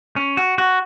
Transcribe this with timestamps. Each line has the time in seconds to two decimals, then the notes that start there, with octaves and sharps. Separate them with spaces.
0.16 C#4
0.37 F#4
0.58 F#4